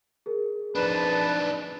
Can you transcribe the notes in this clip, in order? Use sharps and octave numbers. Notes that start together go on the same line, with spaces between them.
G#4 A#4
F3 D4 D#4 B4 A5